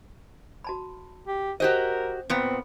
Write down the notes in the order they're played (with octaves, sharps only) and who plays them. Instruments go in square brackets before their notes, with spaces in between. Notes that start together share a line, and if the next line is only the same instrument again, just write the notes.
[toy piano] F#4 A5 B5
[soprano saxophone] G4
[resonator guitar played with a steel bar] F#4 G4 D#5 [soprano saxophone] A#4 [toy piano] C5
[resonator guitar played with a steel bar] A#2 B3 [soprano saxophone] C4